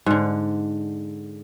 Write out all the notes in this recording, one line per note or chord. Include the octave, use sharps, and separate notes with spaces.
G#2 D3